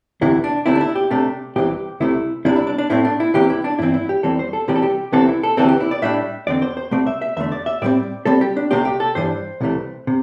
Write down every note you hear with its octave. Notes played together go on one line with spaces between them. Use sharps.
D2 C3 E3 E4
D4
D2 C3 A3 C4 E4
D4
E4
G4
C3 A3 D4
C2 C3 E3 C4 G4
C2 C3 A3 E4
C2 C3 G3 D4 E4
E4
D4
D4
A2 A3 C4 E4
D4
E4
C2 C3 E3 G4
E4
D4
G2 E3 C4 E4
E4
G4
E2 E3 G3 C4 A4
C5
A4
C3 E3 G3 C4 G4
A4
G4
C2 C3 E3 C4 A4
E4
A4
D2 C3 E3 C4 A4
G4
E4
D5
A2 G3 D4 E5
E2 D3 C4 D5
C5
C5
C2 C3 A3 C4 D5
E5
E5
E2 D3 A3 E5
D5
E5
A2 G3 C4 D5
C3 G3 C4 A4
G4
D4
C2 C3 A3 C4 G4
G4
A4
G2 E3 G3 D4 C5
C2 C3 E3 A3
C3